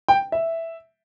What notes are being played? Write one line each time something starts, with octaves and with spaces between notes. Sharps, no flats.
G5
E5